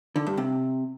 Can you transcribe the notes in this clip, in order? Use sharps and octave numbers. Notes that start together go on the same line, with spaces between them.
D3
G2
C3